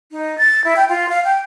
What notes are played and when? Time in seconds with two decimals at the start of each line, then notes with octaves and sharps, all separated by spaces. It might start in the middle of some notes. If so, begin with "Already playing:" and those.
0.11 D#4
0.38 A6
0.64 E4
0.76 G5
0.89 F4
1.09 F5
1.24 G5